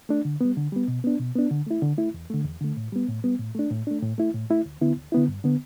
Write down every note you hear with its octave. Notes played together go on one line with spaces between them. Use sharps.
A3 D4
D3
G3 B3
D3
G3 B3
B2
B3 D4
B2
B3 D4
D3
A3 E4
D3
A3 E4
E2
D3 A3
E2
D3 A3
A2
G3 B3
A2
G3 B3
A2
A3 D4
A2
A3 D4
A2
A3 E4
A2
A3 E4
D2
D3 B3 E4
D2
D3 B3 E4
G2
D3 B3